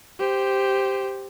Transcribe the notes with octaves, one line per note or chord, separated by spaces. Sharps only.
G4 C5